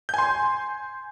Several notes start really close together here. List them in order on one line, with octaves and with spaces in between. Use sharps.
G6 G#5 C6